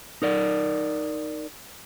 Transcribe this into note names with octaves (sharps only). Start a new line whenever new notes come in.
D#4 A#4 D5